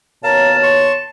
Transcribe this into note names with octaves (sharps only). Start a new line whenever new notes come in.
D#2 B2 A#4 C#5 F5 A5
C6 C#6